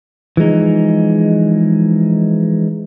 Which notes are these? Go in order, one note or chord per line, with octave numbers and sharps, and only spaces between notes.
E3 F3 G#3 D#4